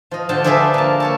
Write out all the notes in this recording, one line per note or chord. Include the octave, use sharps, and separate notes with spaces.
F3 D#5
D3 F3 G5 A5
F3 D4 G#4 A4 B4 E5
A#3 A5
A#3 C#5 A5